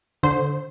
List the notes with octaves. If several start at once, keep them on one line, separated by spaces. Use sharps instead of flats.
D3 C5